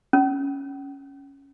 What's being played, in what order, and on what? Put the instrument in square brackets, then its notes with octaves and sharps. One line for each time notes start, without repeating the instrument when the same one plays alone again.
[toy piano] C#4